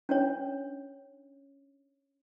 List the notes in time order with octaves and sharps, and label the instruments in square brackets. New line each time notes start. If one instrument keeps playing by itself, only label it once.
[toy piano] C#4 D4 C#5